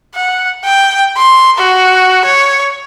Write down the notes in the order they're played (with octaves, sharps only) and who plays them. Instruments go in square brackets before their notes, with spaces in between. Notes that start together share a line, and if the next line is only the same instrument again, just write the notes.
[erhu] F#5
G5
C6
F#4
C#5